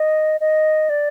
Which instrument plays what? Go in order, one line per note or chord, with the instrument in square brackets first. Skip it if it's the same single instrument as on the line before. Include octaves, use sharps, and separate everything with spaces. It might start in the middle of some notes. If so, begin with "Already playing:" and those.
Already playing: [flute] D#5
D#5
D5